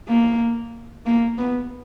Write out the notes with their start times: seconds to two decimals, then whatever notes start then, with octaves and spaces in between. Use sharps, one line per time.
0.09 A#3
1.06 A#3
1.38 B3